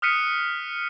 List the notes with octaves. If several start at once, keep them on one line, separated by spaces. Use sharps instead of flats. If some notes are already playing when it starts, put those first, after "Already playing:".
D#6 F6 F#6 B6 C#7 D#7